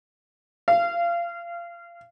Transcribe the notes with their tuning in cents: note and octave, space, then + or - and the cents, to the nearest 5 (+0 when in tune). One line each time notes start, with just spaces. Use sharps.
F5 -25